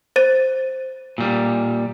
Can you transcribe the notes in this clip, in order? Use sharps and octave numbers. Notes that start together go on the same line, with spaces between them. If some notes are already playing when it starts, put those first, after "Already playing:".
C5 A6 D#7
A#2 G3